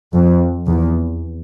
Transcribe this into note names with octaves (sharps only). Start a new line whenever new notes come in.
F2
E2